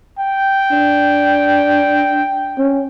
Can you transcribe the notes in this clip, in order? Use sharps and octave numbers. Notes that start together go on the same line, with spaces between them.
G5
D4
C#4